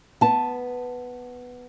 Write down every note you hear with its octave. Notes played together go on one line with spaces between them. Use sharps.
B3 A5